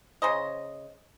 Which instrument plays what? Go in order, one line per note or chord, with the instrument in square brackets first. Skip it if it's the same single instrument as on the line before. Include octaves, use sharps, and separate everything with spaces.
[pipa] C#3 C5 D#5